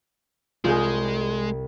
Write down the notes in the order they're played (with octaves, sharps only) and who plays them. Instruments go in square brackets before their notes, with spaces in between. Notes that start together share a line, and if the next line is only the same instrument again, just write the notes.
[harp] C2 G6 E7 [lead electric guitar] G#3 [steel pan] F4 G#4